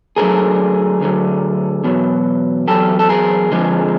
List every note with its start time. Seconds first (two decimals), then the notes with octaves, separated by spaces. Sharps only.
0.16 D2 D3 F#3 G#4 A#4
1.00 D2 D3 F#3
1.84 E2 B2 F#3
2.68 E2 B2 F#3 G4 A4
2.99 A4
3.09 G#4 A#4
3.51 F2 D3 F3 G#3